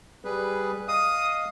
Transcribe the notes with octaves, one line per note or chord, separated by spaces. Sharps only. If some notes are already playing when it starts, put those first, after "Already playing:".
G3 G#4 B4
D#5 F5 D#6